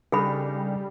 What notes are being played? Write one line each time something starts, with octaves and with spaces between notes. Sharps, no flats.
C#3 G3 D4 D#4 G#4 A4 B5